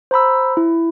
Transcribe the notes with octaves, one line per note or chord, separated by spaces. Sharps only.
C5 A#5 B5 E6
E4